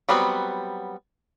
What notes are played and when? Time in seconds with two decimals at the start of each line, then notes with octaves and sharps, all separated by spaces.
0.09 F#3 G3 B3 C4